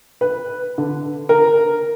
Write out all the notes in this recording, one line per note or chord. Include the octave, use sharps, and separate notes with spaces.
B4
D3
A#4